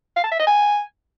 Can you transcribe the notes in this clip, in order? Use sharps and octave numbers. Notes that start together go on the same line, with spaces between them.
F5
A5
E5
D#5
G#5